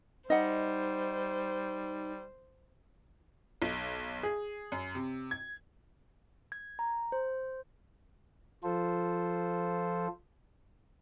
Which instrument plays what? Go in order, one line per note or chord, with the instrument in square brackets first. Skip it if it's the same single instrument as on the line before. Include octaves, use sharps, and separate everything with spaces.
[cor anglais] G3 [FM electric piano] D#4 [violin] C5 [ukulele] D#5 F#5
[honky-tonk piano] B1
G#4
F#2
C3
G#6
[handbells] G#6
A#5
C5
[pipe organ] F3 F4 A4 C5